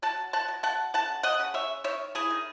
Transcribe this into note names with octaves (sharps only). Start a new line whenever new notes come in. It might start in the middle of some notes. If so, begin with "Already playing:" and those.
F#3 F#5 A5
F#5 A5
F#3
F#5 A5
C#3 F#5 A5
D#5 F#5
C#3
C#5 E5
D#3 C#5 E5
E4 G#4
D#3